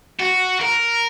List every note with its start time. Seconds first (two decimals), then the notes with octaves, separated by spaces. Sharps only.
0.20 F#4
0.61 A#4